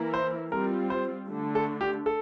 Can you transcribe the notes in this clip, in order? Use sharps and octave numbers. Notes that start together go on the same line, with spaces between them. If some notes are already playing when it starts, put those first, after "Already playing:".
Already playing: E3 A#3 E4 A#4
C5
G3 C4 F4 A#4
C5
D3 A3 D4
A4
G4
A4